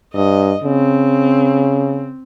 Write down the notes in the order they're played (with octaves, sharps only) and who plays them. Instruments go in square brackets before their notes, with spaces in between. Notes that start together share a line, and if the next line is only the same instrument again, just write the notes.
[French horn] G2 [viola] D#5
[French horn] C#3 [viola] C4